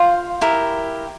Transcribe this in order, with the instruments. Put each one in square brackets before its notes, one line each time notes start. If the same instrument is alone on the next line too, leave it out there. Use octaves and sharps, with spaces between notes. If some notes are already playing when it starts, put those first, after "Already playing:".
Already playing: [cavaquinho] F4 C5 F5
E4 G4 A#4